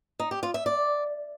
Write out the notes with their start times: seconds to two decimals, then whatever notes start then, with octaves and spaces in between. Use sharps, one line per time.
0.20 D#4
0.31 G4
0.43 F4
0.54 E5
0.66 D5